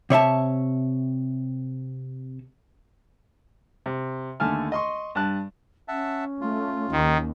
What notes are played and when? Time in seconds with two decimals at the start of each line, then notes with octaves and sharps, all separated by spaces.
0.10 C3 C#5 E5 A5
3.86 C3
4.40 D#2 D3 A3 G#5 A5 F6
4.72 D#5 C6 C#6
5.15 G2 A5 F#6
5.88 C#4 E5 F#5 A5
6.41 A3 F4
6.92 D#2 D#3